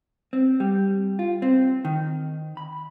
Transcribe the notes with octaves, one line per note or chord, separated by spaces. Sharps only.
C4
G3
F4
C4
D#3
B5